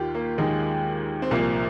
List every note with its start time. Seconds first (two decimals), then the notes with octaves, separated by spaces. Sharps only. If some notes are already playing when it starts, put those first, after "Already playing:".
Already playing: D#2 D#3 F4 G4
0.15 A#3
0.38 D#2 D#3 G#3
1.22 C4
1.31 C2 A#2 F3 A#3